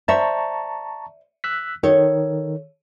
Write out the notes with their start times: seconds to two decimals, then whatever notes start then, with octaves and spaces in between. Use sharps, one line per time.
0.08 C5 D5 E5 A5 A#5 C#6
1.44 E6 F#6 B6
1.83 D#3 A4 C#5